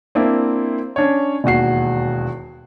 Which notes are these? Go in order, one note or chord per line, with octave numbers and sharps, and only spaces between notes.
A#3 C4 D4 E4
C#4 D4 C#5
E1 D#2 F#4 C7